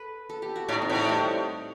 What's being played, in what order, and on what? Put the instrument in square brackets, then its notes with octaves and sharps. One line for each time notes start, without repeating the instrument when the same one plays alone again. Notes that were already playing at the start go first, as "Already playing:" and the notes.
Already playing: [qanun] A4 B4
A4
G4
F#4
[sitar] A2 [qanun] D#4
[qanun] C4
[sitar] A2
[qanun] A3
G3